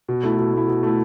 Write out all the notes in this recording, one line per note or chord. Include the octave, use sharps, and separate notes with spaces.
B2
A3 E4
B2
A3 E4
B2
A3 E4